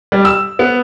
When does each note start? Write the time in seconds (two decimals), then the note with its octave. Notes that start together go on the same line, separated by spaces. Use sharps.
0.12 G3
0.25 E6
0.59 B3